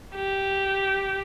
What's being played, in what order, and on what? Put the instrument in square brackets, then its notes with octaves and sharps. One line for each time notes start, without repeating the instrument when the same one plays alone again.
[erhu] G4